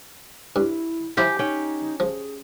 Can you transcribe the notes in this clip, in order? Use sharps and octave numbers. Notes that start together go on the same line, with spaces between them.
G2 E4
F3 E4 F4 G4 G#5
C#4 D#4 G5
F3 G#4